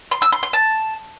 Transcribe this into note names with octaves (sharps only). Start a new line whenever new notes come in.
C6
E6
C6
C6
A5